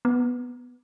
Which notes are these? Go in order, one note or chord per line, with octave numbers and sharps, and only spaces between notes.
B3